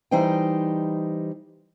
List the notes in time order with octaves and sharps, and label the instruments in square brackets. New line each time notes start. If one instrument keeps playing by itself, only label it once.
[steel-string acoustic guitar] E3 G3 D#4 C5 D#5 G5